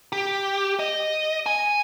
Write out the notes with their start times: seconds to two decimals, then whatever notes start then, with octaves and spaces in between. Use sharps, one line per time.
0.12 G4
0.79 D#5
1.46 G#5